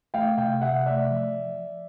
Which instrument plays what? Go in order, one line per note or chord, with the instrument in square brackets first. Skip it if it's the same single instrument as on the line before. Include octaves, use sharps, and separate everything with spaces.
[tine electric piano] A3 [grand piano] F5 G5
[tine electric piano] C3 [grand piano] F5 G5
[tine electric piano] C3 [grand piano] E5 F#5
[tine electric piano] A3 [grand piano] D5 E5
[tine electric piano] F3